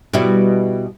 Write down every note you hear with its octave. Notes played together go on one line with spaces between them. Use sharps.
B2 G3 E4